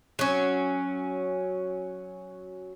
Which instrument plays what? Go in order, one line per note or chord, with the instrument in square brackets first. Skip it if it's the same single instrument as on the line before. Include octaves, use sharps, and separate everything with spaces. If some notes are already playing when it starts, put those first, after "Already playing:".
[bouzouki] F#3 C#4